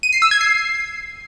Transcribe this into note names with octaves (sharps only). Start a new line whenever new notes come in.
D#7
C7
E6
G#6
C7